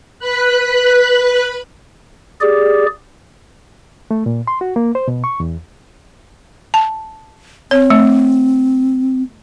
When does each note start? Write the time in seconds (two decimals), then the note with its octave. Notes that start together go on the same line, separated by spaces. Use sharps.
0.19 B4 B5 F#6
2.41 G4 G#4 D5
4.11 A3
4.26 A#2
4.47 C6
4.61 F#4
4.76 A#3
4.95 C5
5.08 B2
5.24 C#6
5.40 E2
6.74 A5
7.71 C4 C#5
7.90 A3